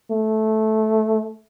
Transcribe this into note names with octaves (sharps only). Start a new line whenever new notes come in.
A3